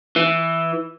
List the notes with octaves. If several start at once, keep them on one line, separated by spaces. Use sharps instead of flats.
E3